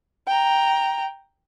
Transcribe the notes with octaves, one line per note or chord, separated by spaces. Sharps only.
G5 A#5